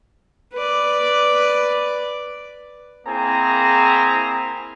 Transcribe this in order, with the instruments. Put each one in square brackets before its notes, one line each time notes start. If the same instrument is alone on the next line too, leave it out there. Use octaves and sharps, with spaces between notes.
[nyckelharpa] B4 D5
[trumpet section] A#3 C4 E4 G#4 G#5 A#5